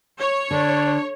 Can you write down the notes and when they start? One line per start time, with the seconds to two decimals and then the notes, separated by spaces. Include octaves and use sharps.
0.20 C#5
0.51 D3 D4